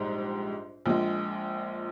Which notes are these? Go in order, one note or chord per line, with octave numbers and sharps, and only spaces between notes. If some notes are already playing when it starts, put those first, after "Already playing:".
Already playing: A#1 G#2 G3
A#1 A#2 G#3